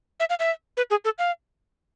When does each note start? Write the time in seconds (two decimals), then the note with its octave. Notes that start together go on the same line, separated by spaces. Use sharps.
0.20 E5
0.30 F5
0.40 E5
0.77 B4
0.91 G#4
1.05 A4
1.18 F5